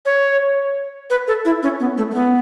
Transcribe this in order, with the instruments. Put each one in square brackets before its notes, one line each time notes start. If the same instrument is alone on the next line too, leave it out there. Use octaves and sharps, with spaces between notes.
[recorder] C#5
B4
A4
E4
C#4
B3
A3
A3
B3